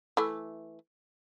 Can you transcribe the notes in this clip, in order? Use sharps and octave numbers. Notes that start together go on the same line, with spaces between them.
E3 A3